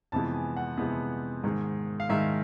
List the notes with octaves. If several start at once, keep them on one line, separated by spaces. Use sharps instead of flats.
F2 C3 E3 G#3 B3 A5
G#5
F#5
F2 C3 E3 G#3 B3
G#2 D#3 G#3
F5
G#2 D#3 G#3 E5